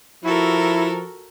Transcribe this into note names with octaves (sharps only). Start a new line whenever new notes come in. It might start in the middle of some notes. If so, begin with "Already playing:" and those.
F3 E4 F#4 A4 A#4